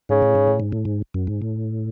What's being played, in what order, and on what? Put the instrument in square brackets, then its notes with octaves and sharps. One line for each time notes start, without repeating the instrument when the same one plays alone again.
[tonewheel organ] G#2 [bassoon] C#3
[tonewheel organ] A2
G#2
A2
G#2
A2
G#2
F#2
G#2
A2